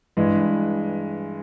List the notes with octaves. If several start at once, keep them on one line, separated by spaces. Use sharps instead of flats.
G2 E3 G#3